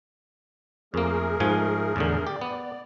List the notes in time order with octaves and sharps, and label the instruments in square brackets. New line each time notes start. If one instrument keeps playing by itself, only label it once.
[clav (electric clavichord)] F2 A#3 [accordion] A3 G#4 A#4
[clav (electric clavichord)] G#2 F3 G#5
E2 A2 D3
[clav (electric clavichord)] G4 [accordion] D5
[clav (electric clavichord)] B3